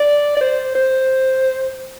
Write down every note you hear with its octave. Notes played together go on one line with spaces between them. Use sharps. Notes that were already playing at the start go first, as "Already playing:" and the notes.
Already playing: D5
D5
C5
C5